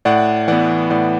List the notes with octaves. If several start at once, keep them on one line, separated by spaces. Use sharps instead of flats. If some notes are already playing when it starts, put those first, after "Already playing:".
A2 D5 F#5
E3 B3 D5 F#5
A2 D5 F#5